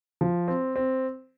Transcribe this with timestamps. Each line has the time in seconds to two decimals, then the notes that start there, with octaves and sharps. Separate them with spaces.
0.21 F3
0.48 C4
0.76 C4